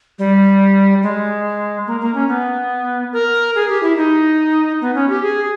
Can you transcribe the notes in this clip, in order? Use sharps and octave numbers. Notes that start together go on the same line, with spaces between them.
G3
G#3
A#3
A#3
C#4
B3
A#4
G#4
G4
E4
D#4
B3
C#4
G4
G#4